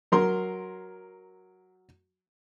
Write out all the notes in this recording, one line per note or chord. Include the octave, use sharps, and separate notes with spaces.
F#3 A#4 C6